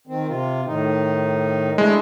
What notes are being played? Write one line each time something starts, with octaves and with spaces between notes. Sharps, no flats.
D#3 C4
C3 F4
A2 D#3 D#4
G#3 A3 D4 E4